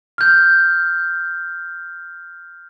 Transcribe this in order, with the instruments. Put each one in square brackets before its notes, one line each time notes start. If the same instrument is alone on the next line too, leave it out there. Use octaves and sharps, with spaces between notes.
[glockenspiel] F6 G6